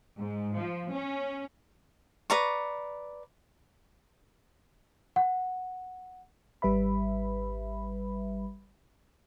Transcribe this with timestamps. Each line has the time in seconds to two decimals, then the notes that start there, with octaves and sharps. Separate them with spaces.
0.18 G#2
0.57 F3
0.92 C#4
2.30 B4 D5 A#5 C#6
5.16 F#5
6.62 G#1 G3 B4 E5 B5